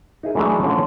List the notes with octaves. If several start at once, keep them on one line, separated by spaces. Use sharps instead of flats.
D#4 E4 G#4 A#4
E3 F#3 G#3 A3 D4
D3 F3 C#4